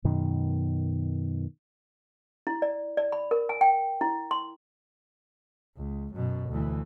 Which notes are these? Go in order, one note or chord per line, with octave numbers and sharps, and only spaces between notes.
F#2 B2 D#3
E4
D5
D5
B5
A#4
G#5
G5
E4
C6
C#2
F#2 B2
D2 E3